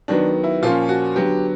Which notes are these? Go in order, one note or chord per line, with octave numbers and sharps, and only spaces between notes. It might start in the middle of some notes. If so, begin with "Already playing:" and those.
D#3 F#3 B3 D4
E4
A#2 F3 A#3 C#4 F4
F#4
D3 F#3 B3 G4